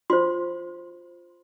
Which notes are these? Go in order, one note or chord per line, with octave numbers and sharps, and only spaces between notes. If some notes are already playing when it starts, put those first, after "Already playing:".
F4 C5 C6